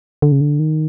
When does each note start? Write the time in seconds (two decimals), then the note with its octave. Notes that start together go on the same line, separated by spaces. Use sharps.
0.22 D3
0.32 C#3
0.41 D3
0.59 D#3